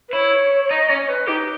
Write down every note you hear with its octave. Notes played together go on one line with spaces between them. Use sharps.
B4
E4 C#5
C#5
D#4 D#5
C#4 C#5
B4
D#4 G4